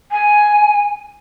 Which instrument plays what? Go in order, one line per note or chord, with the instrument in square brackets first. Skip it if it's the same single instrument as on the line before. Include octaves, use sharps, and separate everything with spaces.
[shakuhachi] G#5